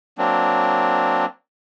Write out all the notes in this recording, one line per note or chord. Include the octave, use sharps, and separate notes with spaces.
F#3 A#3 C4 D4